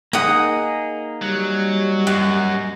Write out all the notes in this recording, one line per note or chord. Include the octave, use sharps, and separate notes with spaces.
A#3 D#4 G#4 F#5 D#6
F#3 G3
F#2 F#4